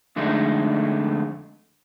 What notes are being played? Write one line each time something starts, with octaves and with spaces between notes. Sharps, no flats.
F2 D3 G#3 A3 D#4